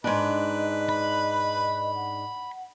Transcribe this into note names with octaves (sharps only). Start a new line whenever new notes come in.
G#2 D4 B4 D#5
B5
F#5